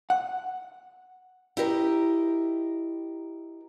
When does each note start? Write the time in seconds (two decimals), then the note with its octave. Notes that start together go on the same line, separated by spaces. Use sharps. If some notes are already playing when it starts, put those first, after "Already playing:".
0.10 F#5
1.57 E4 G4 A#4 D#5